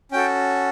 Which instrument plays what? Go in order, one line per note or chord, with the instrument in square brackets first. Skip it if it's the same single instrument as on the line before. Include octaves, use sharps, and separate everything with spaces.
[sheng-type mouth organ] C#4 F#4 A4 G5